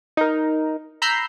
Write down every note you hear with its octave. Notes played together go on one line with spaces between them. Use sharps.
D#4 A#4
A#5 B5 E6 G6 C7